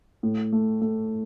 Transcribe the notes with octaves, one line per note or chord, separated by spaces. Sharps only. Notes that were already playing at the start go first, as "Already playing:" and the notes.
A2
A3
A3